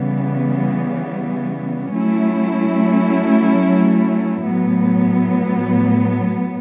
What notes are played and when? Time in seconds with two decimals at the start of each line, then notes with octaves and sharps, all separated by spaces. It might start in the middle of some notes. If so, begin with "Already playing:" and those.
Already playing: C#3 E3 G3 B3
1.95 F#3 A3 C#4 E4
4.44 A2 F#3 B3